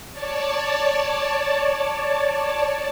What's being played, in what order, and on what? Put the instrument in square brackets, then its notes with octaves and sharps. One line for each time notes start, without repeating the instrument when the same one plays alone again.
[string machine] C#5 D5 A5